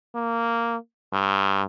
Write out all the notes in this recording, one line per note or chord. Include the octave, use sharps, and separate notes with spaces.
A#3
G2